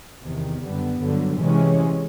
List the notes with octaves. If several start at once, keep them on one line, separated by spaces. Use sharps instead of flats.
E2 C3 D#3
F#2 D3 G3 B3
G2 D3 F#3
C3 E3 G#3 C#4